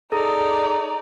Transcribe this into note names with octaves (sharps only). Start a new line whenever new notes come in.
D#4 G#4 A4 D5 A#5